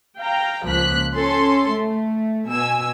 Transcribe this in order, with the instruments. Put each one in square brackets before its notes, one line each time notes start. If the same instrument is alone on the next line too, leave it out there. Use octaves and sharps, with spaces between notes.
[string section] F5 G5 A#5
C#2 F3 A#3 F#6 B6
C#4 A4 C6
A3
B2 G#5 E6